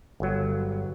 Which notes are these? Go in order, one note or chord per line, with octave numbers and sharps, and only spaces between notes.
G1 F#3